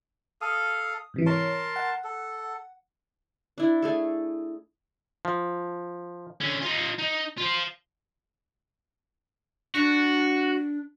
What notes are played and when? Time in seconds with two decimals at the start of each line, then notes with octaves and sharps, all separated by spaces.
0.41 A4 F5 D#6
1.14 G#2 C3 E3
1.26 A#4 C#5 A5 C6
1.76 F#5
2.04 A4
3.58 D4 E4
3.82 A3 G#4 A4
5.25 F3
6.40 D3 C#4
6.61 D#4 F4
6.98 D#4
7.38 F4 C5
9.75 D4 F#4